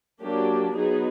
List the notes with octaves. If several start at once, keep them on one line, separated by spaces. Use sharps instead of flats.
F#3 A#3 D4 G4
F#3 B3 D#4 G#4